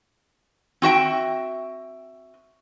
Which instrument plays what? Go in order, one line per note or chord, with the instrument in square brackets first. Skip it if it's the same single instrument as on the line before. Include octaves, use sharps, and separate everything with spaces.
[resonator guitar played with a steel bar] C4 F#4 E5 G5